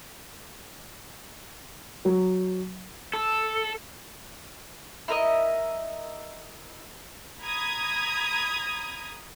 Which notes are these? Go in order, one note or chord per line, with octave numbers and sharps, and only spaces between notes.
F#3
A4
E4 A#4 C5 D#5
A#5 B5 D#6 G#6